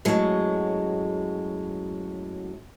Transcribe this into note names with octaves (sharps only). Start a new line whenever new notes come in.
F#2 A2 F#3 G#3